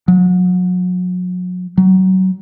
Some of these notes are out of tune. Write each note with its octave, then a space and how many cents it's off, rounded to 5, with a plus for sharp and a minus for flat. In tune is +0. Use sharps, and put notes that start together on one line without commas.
F#3 -35
F#3 +20